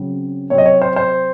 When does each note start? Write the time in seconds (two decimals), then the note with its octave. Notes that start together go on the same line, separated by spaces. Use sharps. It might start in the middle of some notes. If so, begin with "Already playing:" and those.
Already playing: C#3 F#3 C4
0.50 C3 F#3 C4 C#5
0.58 D#5
0.66 C#5
0.82 C5
0.96 C5